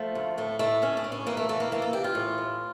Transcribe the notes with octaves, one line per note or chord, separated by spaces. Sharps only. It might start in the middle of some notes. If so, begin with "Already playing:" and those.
Already playing: F3 A3
D2
A2 A3
A2 A3
A2 C#4
D4
A2
C#4
E3 A#3
A3
E3 A3
A#3
E3 A#3
A4
E3 G4
F4
A2
A2